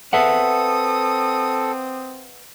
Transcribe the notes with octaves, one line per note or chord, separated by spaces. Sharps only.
C4 A4 B4 E5 F#5 D#6